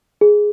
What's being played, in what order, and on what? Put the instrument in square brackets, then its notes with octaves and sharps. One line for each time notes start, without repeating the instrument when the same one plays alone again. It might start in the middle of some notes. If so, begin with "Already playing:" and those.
[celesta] G#4